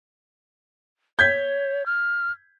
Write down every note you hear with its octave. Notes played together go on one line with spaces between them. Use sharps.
C#5 G6 G#6 B6
F6